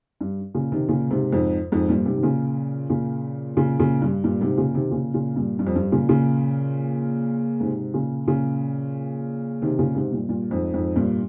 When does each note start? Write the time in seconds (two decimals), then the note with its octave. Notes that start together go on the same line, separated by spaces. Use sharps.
0.21 G2
0.55 A#2 C#3
0.72 C3 D#3
0.88 A#2 C#3
1.11 G#2 C3
1.32 F2 G#2
1.72 F2 G#2
1.89 G2 A#2
2.06 G#2 C3
2.18 D#3
2.23 A#2 C#3
2.90 A#2 C#3
3.57 A#2 C#3
3.80 A#2 C#3
4.02 G2
4.24 G2 A#2
4.41 G#2 C3
4.58 A#2 C#3
4.75 C3 D#3
4.91 A#2 C#3
5.14 A#2 C#3
5.36 G2 A#2
5.59 G2
5.67 F2
5.76 G2
5.92 A#2 C#3
6.09 A#2 C#3
7.60 G#2 C3
7.94 A#2 C#3
8.27 A#2 C#3
9.62 C3 D#3
9.79 A#2 C#3
9.95 G#2 C3
10.12 G2 A#2
10.29 G2 A#2
10.51 F2 G#2
10.74 F2 G#2
10.96 G2 A#2